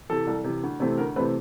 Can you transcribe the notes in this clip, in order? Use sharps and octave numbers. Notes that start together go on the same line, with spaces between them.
C3 E3 A4
C2
C3 E3
D2
C3 E3 A3 C4
D2 A#4
C3 E3 A3 C4 B4